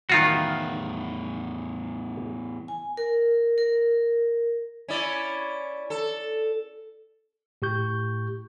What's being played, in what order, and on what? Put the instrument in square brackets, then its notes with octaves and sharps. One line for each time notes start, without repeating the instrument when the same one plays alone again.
[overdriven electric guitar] E2 A2 [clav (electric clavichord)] D#3 F4 F#4
[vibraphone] G#5
A#4
A#4
[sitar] C#4 E4 D5
A4
[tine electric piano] A2 G4 C#6 G6